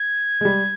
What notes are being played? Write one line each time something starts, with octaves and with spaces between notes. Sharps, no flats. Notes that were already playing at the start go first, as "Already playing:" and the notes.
Already playing: G#6
G#3
G3